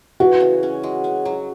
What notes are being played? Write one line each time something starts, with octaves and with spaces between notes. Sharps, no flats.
E3 F#4
C#3
C#4
G#3
C#4
F#3